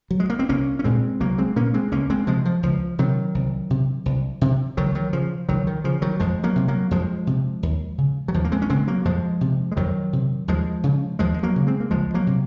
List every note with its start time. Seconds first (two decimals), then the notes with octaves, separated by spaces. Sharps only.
0.11 F#3
0.20 G#3
0.30 A#3
0.39 C4
0.49 C2 A#3 C#4
0.79 C#4
0.84 A#2 G#3 C4
1.20 C2 F#3 A#3
1.38 G#3 C4
1.56 A#2 A#3 C#4
1.74 G#3 C4
1.92 C#2 A#3 C#4
2.10 G#3 C4
2.27 C3 F3 G#3
2.45 F3
2.63 C#2 F3
2.99 C3 D#3 F#3
3.35 C2
3.70 C3
4.06 C2
4.41 C3
4.77 C#2 D#3 F#3
4.95 D#3 F#3
5.13 C#3 F3
5.49 C#2 D#3 F#3
5.67 D#3
5.84 C#3 F3
6.02 D#3 F#3
6.20 F2 F3 G#3
6.43 F#3 A#3
6.56 C3
6.68 F#3 A#3
6.91 F2 F3 G#3
7.27 C3
7.63 D#2
7.98 C#3
8.28 F#3
8.34 D#2 F3
8.44 A#3
8.52 G#3 C4
8.62 C#4
8.70 C#3 G#3 C4
8.87 F#3 A#3
9.05 F2 F3 G#3
9.41 C3
9.72 G#3
9.77 F2 D#3 F#3
10.13 C3
10.48 D#2 F3 G#3
10.84 C#3
11.19 D#2 F3 G#3
11.34 G#3
11.43 F#3 A#3
11.56 C#3
11.67 G#3 C4
11.80 A#3
11.91 C#2 F3 G#3
12.14 F#3 A#3
12.27 C3